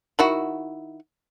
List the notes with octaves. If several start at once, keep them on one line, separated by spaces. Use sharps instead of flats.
D#3 E4 F#4